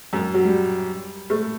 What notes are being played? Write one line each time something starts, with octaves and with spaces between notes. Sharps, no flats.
F#2
F#3
G3
A3